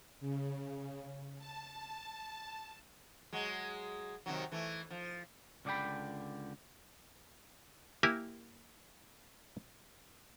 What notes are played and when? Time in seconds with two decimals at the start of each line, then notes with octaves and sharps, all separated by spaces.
0.20 C#3
1.39 A5
3.33 F#3 G#3
4.26 C3 D#3 F#3
4.52 E3 A3
4.91 F3
5.65 C#2 D3 D5 D#5 G5 B5
8.03 A#3 E4 G4 A#4 G#5